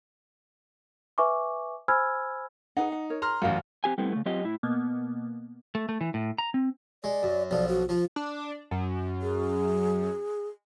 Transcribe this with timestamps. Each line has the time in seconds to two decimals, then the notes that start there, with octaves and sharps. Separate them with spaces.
1.18 B4 E5 G#5 C#6 D6
1.88 C5 G#5 B5 E6 F6 G#6
2.77 D#4 G#4 B4 F#5
2.92 F#5
3.10 A#4 C#5
3.22 A#5 C6 F6
3.42 A1 F#2 F4 F5 F#5
3.84 C4 G4 G#5
3.98 G3 A3 B3 C4 E4
4.13 C#3 A3
4.26 F#3 C4 F4 G4 D#5
4.44 A2 E4
4.63 B2 A#3 B3
5.75 A3
5.89 A3
6.01 E3
6.14 A2
6.38 A#5
6.54 C4
7.04 G#3 D5
7.23 F#2
7.51 B1 F3 D5
7.68 F#4
7.89 F3 F4
8.16 D4
8.71 F#2
9.22 G#4